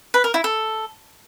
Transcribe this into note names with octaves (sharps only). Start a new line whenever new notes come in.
B4
A#4
E4
A4